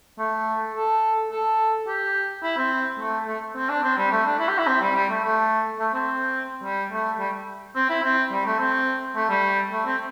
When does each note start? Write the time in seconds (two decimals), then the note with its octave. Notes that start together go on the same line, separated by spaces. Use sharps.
0.19 A3
0.76 A4
1.31 A4
1.88 G4
2.43 E4
2.57 C4
3.00 A3
3.28 A3
3.56 C4
3.69 D4
3.83 C4
3.97 G3
4.12 A3
4.26 D4
4.39 E4
4.49 G4
4.58 E4
4.67 C4
4.82 G3
4.95 G3
5.09 A3
5.24 A3
5.80 A3
5.94 C4
6.64 G3
6.92 A3
7.19 G3
7.75 C4
7.90 E4
8.03 C4
8.32 G3
8.46 A3
8.60 C4
9.15 A3
9.29 G3
9.72 A3
9.86 C4